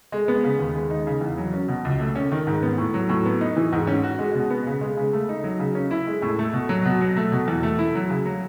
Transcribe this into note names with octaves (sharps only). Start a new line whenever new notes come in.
G#3
B3
C#3
D#2
G#3
D#4
C#3
E2
F#3
C#4
B2
C#2
A3
C#4
D#3
G#2
B3
A2
F#3
A2
B3
D#4
E3
G#2
C#4
F#4
G#3
B2
B3
C#3
G#3
C#3
A3
D#4
F#3
C#3
C#4
E4
G#3
A2
A3
B2
F#3
B2
F#3
A3
B2
E2
A3
E4
F#3
C#3
F#3